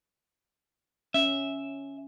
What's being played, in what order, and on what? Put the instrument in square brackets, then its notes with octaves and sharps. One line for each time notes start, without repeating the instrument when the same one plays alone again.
[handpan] C#4 [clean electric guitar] E5